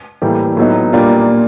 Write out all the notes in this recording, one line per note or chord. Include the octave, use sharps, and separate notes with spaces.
A2 E3 G3 A#3
A2 F#3 B3 D#4
A#2 G3 A#3 D4 F4